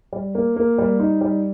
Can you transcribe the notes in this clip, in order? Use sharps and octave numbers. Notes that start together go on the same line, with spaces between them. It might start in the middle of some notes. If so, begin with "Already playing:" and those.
G3
A#3
A#3
G3
D#4
G3